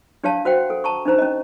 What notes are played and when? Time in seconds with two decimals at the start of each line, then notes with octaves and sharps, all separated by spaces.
0.24 D4 G4 C#5 F5 A5
0.45 F#4 C5 F#5 G5
0.70 A4
0.84 A5 A#5 C#6
1.05 D4 D#4 C5 A#5
1.18 C#4 D#5